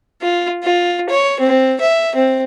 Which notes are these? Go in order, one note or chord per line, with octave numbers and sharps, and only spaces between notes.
F4
F4
C#5
C4
E5
C4